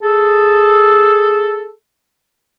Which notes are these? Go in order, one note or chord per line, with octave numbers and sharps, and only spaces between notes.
G#4 A4